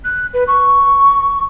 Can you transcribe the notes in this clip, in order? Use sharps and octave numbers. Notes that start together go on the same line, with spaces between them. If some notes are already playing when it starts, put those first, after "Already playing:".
F#6
B4
C#6